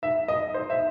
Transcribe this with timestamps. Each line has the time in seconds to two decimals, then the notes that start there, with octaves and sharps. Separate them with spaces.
0.03 D#4 E5
0.28 D#5
0.54 C5
0.70 E5